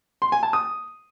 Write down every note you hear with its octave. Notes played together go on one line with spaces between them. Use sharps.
C6
G#5
A5
D#6